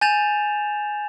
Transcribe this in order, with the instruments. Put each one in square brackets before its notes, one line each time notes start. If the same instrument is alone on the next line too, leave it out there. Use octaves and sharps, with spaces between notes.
[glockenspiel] G#5 G6 A6 E7 F7